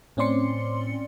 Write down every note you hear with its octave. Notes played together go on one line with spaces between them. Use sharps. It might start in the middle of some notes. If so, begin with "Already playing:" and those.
A2 C4 C#4 D5 C6 C#7